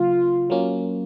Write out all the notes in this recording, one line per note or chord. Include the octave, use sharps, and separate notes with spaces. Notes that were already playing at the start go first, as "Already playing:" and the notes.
Already playing: C#3 F#3 A#3 F4
F#3 A#3 C#4